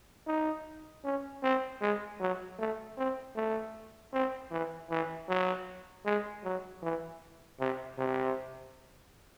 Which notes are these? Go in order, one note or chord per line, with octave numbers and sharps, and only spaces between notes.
D#4
C#4
C4
G#3
F#3
A3
C4
A3
C4
E3
E3
F#3
G#3
F#3
E3
C3
C3